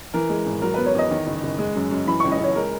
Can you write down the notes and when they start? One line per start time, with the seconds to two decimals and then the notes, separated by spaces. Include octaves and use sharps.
0.14 E3 A#4
0.29 G#3
0.46 G#1
0.62 F#3 A#4
0.74 B3 B4
0.86 C#5
0.95 E2 D#5
1.11 D#3
1.27 F#1
1.43 F#1
1.59 G#3
1.76 F#2
1.91 F#2
2.07 E3 B5
2.20 C#2 C#6
2.31 D#5
2.40 C#2 C#5
2.55 G#3 A#4